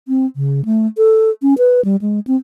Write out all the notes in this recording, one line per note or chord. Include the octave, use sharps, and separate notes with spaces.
C4
C#3
A3
A4
C#4
B4
G3
G#3
C4